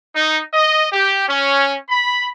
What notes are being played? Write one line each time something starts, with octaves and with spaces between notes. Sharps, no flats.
D#4
D#5
G4
C#4
B5